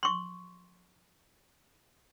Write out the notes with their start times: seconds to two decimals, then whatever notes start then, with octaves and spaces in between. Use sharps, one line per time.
0.03 C6 C#6